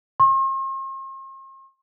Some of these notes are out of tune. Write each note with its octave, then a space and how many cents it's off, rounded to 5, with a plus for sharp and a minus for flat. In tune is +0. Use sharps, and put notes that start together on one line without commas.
C6 +45